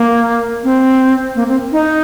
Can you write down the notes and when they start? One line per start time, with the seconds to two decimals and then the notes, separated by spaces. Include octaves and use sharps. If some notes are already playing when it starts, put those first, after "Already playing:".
Already playing: A#3
0.64 C4
1.35 A#3
1.48 C4
1.72 D#4